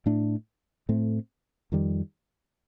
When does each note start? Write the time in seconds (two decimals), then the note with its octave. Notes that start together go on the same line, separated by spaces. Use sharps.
0.06 A2 A3 D4
0.89 A2 A3 C4
1.72 F2 D#3 G3